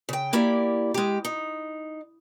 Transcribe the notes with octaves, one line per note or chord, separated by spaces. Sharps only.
C#3 G5
A#3 E4 G4 D5
G#3 G4
D#4